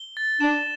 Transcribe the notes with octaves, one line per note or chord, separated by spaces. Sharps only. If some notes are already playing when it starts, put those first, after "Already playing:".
Already playing: G7
A6
D4 E7